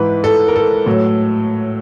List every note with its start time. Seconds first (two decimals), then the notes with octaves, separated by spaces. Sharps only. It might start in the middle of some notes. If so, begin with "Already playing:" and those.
Already playing: G#2 E3 B4
0.24 A4
0.48 A#4
0.56 A4
0.86 A2 F#3